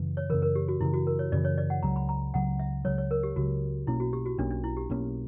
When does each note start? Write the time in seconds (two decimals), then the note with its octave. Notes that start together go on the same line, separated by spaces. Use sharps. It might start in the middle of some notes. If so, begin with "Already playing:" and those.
Already playing: F#2 C#3 E3
0.17 C#5
0.30 F#2 C#3 E3 A#4
0.42 A#4
0.55 G4
0.68 F#4
0.80 F#2 C#3 E3 E4
0.94 F#4
1.07 A#4
1.19 C#5
1.32 F#2 C#3 E3 D5
1.45 C#5
1.58 D5
1.70 F#5
1.83 C#2 C#3 F#3 A#5
1.96 B5
2.09 A#5
2.34 C#2 C#3 F#3 F#5
2.59 E5
2.85 C#2 C#3 F#3 C#5
2.98 C#5
3.11 A#4
3.23 G4
3.36 C#2 C#3 F#3 F#4
3.87 B1 B2 A#3 C#4 E4
4.00 F#4
4.13 G4
4.26 F#4
4.38 B1 B2 A#3 C#4 D4
4.51 D4
4.64 E4
4.77 G4
4.90 B1 B2 A#3 C#4